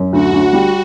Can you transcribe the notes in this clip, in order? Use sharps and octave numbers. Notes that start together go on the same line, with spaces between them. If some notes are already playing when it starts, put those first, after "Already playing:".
Already playing: F#2
D2 F#4
D2
G3